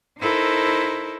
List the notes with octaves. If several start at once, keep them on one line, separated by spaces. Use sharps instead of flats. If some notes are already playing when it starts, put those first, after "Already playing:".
D#4 E4 A4 A#4 C5